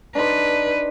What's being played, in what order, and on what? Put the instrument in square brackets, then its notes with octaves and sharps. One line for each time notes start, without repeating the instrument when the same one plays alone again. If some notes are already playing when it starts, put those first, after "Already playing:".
[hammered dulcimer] D4 D#4 C5 [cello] B4